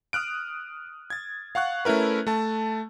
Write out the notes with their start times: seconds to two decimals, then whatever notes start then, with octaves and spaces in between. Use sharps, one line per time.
0.13 D#6 F6 F#6 D7
1.10 G#6 A6
1.55 F5 F#5 C#6 F#6
1.85 A3 C#4 E4 A#4 B4
2.27 A3 A5